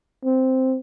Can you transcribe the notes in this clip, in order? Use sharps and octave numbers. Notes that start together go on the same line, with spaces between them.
C4